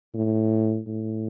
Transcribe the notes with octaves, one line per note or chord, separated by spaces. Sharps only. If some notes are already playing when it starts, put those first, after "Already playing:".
A2
A2